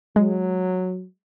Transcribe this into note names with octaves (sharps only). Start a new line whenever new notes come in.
F#3 G#3